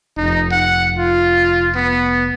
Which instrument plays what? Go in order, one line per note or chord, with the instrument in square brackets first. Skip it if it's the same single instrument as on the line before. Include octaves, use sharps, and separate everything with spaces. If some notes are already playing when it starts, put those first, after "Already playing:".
[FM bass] F1 [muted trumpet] D#4
[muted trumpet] F#5
F4
B3